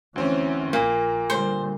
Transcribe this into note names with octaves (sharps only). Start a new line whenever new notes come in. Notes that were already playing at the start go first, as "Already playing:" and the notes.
D2 E3 C4 C#4
A#1 A#2 A#3
D3 G3 C5